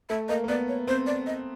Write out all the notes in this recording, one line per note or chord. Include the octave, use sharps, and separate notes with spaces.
A3 E5
A#3 D#5
A#3
B3 D5
C#5
C4 C5
D5
D#5